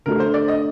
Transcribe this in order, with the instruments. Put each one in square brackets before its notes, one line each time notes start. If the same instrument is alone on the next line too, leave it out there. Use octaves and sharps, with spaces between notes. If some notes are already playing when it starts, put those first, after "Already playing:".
[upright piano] D3 A3 D4 F#4 [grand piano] A#4
[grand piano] C5
D5
D#5